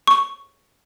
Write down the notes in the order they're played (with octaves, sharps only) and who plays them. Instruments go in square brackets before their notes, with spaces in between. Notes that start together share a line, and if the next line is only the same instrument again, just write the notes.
[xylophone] C#6